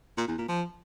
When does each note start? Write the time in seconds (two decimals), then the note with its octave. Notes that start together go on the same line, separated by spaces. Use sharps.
0.18 A#2
0.28 E2
0.38 A#2
0.48 F3